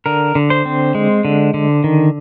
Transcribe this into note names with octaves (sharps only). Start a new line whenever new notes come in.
D3 A#4
D3
C5
C4
G#3
D3
D3
D#3